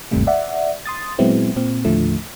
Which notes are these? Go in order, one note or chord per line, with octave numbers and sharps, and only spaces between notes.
G1 D#2 G#2 C3 G3 A3
D5 E5 F#5
C6 D#6 A6
A#2 F#3 G#3 B3 C4 E4
A#2 C4
D#2 A2 D3 F3 A3